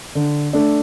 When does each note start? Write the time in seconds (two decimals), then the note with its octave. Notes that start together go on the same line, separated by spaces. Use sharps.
0.15 D3
0.53 A3 D4